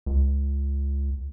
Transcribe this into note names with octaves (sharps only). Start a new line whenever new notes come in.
C#2